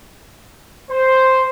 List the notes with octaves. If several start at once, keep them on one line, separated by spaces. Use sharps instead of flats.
C5